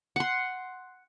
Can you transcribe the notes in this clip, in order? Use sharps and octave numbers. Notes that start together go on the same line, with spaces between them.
F#5 C6